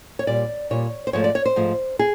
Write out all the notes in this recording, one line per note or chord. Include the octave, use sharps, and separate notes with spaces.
C#5
A#2 G3 D5
A#2 G3 C#5
C5
G#2 F3 A3 C#5
D5
C#5
C5
G#2 F3 A3
G#4